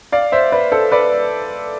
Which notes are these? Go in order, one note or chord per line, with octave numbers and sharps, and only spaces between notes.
D5 F5
C5 E5
B4 D5
A4 C5
B4 D5